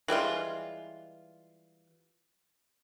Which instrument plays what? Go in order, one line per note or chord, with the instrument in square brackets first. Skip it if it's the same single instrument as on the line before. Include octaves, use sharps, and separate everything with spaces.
[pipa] E3 G3 G#3 F4